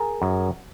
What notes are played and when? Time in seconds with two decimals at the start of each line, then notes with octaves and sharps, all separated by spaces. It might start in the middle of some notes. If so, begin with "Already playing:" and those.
Already playing: G#4 A#4
0.22 F#2